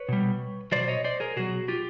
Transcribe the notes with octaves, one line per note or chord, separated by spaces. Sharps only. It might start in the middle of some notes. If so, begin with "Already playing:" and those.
Already playing: B4 C#5
B2 G3
B2 F#3 C5 D5
C#5 D#5
C5 D5
G#4 A#4
B2 F#3 F#4 G#4
F4 G4